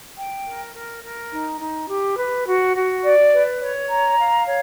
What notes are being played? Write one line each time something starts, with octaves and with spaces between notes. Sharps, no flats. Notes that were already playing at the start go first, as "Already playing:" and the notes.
G5
A#4
A#4
A#4
D#4
D#4
G4
B4
F#4
F#4
D5
B4
C#5
A#5
F5
C#5